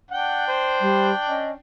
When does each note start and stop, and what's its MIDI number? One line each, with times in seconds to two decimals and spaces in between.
0.11 1.60 62
0.11 0.47 78
0.11 1.60 79
0.48 1.13 72
0.81 1.12 55
1.29 1.54 61
1.29 1.51 75